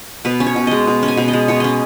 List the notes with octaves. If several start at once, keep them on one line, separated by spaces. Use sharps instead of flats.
B2 B4
C#4
C#5
B2
G#3 D#5
B2
C#4
G#5
B2
D#5
G#3
B2 C#5
C#4 D#5